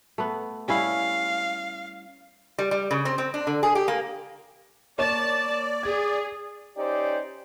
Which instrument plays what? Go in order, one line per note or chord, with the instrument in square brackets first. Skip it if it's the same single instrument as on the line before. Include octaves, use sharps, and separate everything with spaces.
[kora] A3 B3
[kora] G3 C#4 E4 [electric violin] F5
[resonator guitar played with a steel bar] G3
G3
C#3
C4
C4
D4
D3
G#4
G4
A#3
[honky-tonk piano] A#3 C#5 E7 [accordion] D5 [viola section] A5
[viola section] G#4 [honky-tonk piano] G#6
[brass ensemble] C#4 D#4 G4 C5 D5